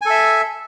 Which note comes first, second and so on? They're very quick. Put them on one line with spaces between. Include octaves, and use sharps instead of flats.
G#5 A4 E5